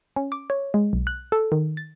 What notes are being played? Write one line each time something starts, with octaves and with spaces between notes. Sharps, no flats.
C#4
D6
C#5
G#3
B1
F#6
A4
D#3
A6